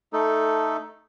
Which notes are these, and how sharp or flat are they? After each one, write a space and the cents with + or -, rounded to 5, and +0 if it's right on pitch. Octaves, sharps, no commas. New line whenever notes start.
A3 +0 D#4 +0 A4 +0